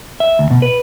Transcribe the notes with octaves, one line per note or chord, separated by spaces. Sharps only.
E5
D2
B2
B4